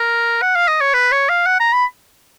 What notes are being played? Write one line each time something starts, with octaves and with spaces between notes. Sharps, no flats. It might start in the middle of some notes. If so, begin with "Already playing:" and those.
Already playing: A#4
F#5
F5
D#5
C#5
B4
C#5
F5
F#5
A#5
B5